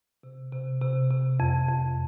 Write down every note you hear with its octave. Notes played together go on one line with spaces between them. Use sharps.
C3
C3
C3
C3
F2
F2